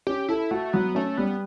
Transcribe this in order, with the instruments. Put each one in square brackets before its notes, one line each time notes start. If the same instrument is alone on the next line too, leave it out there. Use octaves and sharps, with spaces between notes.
[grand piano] C#4 [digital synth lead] G4
[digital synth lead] E4 [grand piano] A4
[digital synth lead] A3 [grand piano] F#4
[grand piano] F#3 [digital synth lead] B3
[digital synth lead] A3 [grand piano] C#4
[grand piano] G3 [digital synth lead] B3